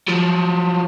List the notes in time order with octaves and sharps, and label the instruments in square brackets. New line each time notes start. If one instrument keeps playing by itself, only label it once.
[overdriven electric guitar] F3 F#3